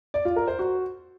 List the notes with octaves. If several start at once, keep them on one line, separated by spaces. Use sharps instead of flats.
D5
F4
A#4
C5
F#4